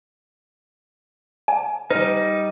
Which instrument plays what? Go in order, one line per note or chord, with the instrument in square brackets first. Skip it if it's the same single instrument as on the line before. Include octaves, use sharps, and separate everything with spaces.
[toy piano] G#5
[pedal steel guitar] G3 D#4 [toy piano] B4